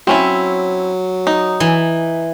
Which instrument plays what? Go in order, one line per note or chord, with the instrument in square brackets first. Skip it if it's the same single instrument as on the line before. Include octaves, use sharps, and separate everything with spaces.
[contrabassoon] F#3 [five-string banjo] C4 C#4 E4
[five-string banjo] D#4
[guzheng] E3